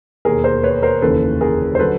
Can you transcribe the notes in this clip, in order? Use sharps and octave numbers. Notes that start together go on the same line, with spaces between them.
E1 D#2 D#3 G#4 A#4
A#4 C5
B4 C#5
A#4 C5
F1 D#2 C#3 E3 A4 B4
G#4 A#4
C5
D3 F#3 A4 B4